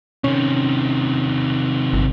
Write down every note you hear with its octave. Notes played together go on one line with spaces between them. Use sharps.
C3 D#3 C#4
G1